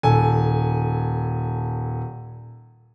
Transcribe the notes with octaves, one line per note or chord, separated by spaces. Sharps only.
D#1 A4 G#5